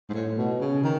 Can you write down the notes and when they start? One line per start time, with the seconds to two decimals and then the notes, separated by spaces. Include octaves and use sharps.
0.09 G#2
0.14 A2
0.37 B2
0.60 C#3
0.83 D#3